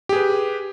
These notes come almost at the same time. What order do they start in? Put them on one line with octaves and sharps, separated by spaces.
G4 G#4 B4